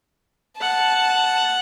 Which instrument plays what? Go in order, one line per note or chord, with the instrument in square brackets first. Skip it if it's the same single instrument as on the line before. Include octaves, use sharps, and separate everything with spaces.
[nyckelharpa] F#5 [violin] A5